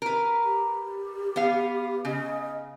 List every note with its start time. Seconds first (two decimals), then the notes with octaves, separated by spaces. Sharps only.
0.02 A#4 B4
0.42 G4
1.36 B3 F5
2.05 C#3 D#5